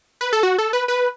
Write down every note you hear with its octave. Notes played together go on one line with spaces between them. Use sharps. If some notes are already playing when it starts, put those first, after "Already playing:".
B4
A4
F#4
A4
B4
B4